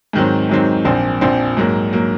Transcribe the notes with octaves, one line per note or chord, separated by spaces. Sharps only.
G#2 D#3 F#3 C4
G#2 D#3 F#3 C4
A#1 A#2 F3 C4
A#1 A#2 F3 C4
G#2 F#3 A#3
F#3 A#3